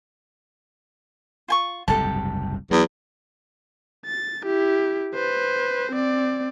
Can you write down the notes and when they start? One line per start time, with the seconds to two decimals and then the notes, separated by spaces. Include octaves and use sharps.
1.48 F4 G#5 C#6
1.88 F#1 C2 G#2 G4 A4 A5
2.71 E2 F#3
4.05 A6
4.44 E4 G4
5.15 B4 C5
5.92 C4 D5